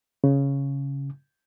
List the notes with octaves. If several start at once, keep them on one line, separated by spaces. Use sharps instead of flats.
C#3